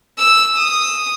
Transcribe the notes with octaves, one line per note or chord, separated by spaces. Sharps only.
E6
D#6